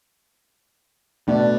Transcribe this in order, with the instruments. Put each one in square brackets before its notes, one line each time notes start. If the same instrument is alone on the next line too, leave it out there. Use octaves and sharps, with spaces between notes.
[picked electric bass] B2 [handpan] A3 [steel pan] D4